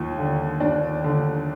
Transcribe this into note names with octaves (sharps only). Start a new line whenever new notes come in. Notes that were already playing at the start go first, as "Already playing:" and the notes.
Already playing: D#2 F4
D3
D#2 D4
D3